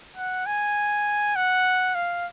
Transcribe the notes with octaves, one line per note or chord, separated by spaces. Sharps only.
F#5
G#5
F#5
F5